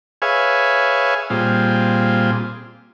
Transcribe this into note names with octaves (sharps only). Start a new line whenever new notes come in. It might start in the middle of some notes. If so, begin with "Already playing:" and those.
G#4 B4 C#5 E5 F5 G#5
A#2 G3 C4 F4 G#4